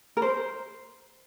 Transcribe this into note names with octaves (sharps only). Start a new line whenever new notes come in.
A#4
C5